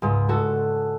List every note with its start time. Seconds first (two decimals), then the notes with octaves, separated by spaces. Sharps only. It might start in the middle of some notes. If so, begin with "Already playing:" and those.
0.02 C#2 G#2
0.28 D4 F#4 A4